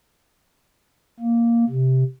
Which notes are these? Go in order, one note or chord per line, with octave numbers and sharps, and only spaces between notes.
A#3
C3